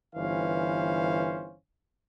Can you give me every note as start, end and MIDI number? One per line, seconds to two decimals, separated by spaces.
0.15 1.55 31
0.15 1.55 52
0.15 1.55 61
0.15 1.55 72
0.15 1.55 77